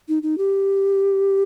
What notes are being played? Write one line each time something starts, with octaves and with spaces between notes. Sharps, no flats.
D#4
D#4
G4